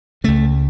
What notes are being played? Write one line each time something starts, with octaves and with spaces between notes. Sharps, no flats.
C#2 C#3 A3